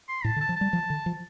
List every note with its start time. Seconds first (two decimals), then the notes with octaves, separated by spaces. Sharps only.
0.08 C6
0.24 A2 A5
0.36 D3
0.40 A5
0.49 F3
0.56 G3 A5
0.73 F3
0.90 D3
1.06 F3